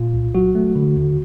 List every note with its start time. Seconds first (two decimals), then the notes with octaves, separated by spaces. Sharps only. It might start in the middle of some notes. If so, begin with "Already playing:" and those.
Already playing: A#2 F4
0.14 C2
0.35 F#3 F#4
0.55 A3
0.76 D3
0.96 D#2